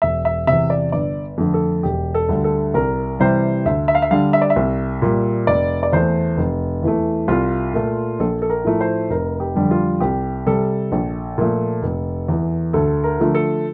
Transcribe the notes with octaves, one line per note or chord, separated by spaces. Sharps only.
E1 E5
E5
E2 C3 E5
D5
G1 D5
F2 D3 A3
A4
E1 G4
A4
D2 D3 G3
A4
C2 A#4
C3 E3 G3 C5
D2 E5
E5
F5
E5
D3 G3 F5
E5
D5
E5
C2
A#2 G3
F1 D5
D5
E2 E3 A3 C5
F1
E2 E3 A3
C2 F4
A#2 A3
A#1 A4
A4
A#4
A2 F3 A3
C5
F1 A#4
G4
F2 D3 G3
F4
C2 G4
C3 G3 A4
A#1
A#2 F3 A3
F1
E2 E3
D2 A4
A#4
D3 F3 A3
A4